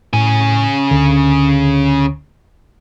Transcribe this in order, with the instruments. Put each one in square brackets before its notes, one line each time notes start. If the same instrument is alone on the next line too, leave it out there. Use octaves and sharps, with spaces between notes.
[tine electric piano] A2 [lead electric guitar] C#3 G#5
[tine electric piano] D2 D3